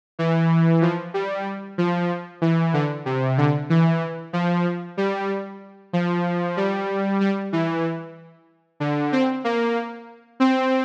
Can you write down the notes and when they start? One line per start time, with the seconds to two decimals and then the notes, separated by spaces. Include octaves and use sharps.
0.19 E3
0.82 F3
1.14 G3
1.78 F3
2.41 E3
2.74 D3
3.06 C3
3.38 D3
3.70 E3
4.33 F3
4.97 G3
5.93 F3
6.57 G3
7.21 G3
7.53 E3
8.80 D3
9.12 C4
9.44 A#3
10.40 C4